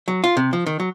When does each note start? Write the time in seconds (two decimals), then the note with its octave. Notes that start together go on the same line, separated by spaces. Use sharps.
0.08 F#3
0.24 F4
0.37 C3
0.53 F3
0.66 D#3
0.80 F#3